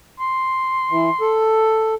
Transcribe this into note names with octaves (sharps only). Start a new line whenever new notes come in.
C6
E3
A4